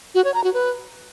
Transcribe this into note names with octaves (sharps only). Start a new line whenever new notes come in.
F#4
C#5
A#5
F#4
B4